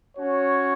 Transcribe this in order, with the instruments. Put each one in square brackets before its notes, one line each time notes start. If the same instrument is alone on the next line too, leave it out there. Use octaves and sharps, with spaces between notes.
[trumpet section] C#4 F#4 C#5